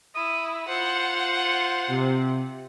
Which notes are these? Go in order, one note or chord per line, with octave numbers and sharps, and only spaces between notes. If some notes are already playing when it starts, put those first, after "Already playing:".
E4 D#6
F4 C5 F#5
C3